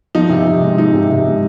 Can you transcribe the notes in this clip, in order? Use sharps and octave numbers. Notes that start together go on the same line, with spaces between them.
F3 D#4
C3
C3
G#3
F3 D#4
C3
C3
G#3